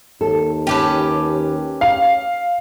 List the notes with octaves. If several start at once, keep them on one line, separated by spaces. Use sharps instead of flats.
D#2 A4
C#4 G4 B4 G5 A5
F5